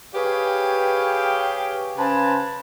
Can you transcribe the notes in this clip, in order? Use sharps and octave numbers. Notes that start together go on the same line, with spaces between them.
G4 G#4 B4 C#5 F5 G5
C#3 B4 C5 G#5 A5